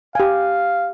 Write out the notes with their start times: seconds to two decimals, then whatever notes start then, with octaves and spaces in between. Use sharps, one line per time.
0.15 G4 F5 G#5